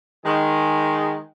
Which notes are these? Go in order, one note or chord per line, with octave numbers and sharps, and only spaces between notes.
D#3 G#3 G#4